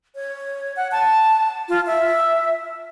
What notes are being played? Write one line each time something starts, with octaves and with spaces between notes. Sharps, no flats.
C#5
F#5
A5
F4
E5